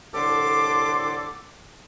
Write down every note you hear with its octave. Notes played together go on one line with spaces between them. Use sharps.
C2 A2 D3 A4 C6 D6